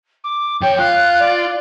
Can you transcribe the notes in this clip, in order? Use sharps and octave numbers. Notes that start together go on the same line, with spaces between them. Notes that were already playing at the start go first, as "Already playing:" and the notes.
D6
F2 C#5 G5
F4 F#6
D5